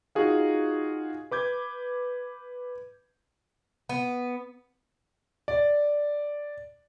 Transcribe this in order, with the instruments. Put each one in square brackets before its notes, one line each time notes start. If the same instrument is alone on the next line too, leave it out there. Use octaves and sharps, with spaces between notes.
[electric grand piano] D#4 F4 F#4 G#4 F5
B4 D6 G6 G#6
[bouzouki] B3
[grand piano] D5